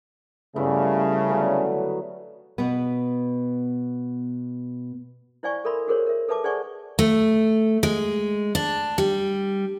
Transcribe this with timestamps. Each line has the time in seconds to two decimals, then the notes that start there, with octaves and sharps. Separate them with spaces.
0.56 G2 C#3 A3 B3 E4
1.29 D3 F#3 B3
2.58 B2 B3
5.43 E4 C5 D5 F5 G#5 C#6
5.65 A4 A#4 E5 B5 C6
5.87 F#4 G#4 A#4 C5 C#5
6.07 A#4 E5
6.29 A4 B4 E5 A5 D6
6.44 G#4 C5 D5 F#5 G#5 C#6
6.99 A3
7.83 G#3
8.55 D4
8.98 G3